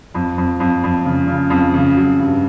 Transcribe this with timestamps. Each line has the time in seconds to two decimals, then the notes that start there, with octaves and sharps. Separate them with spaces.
0.15 F2
0.38 F2
0.60 F2
0.84 F2
1.05 C#3
1.28 C#3
1.50 F2
1.74 C#3
1.96 F#3
2.19 G2